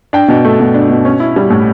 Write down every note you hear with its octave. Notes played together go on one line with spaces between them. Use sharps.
D4 G5
B2
A3
B2
D4
B2
C#4
E4
G3
A2